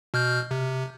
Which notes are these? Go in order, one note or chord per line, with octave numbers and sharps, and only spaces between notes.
B2 F6 G6
C3